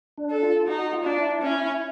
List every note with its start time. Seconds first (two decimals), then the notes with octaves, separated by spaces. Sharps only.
0.18 D4
0.30 A4
0.42 F4
0.67 D#4 F#4
0.92 F4
1.04 D4
1.18 E4
1.42 C#4